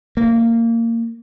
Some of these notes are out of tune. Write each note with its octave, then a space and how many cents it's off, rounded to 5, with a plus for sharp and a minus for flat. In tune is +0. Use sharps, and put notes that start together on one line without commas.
A#3 -20